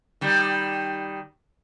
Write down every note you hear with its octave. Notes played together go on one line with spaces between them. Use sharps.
D#3 G3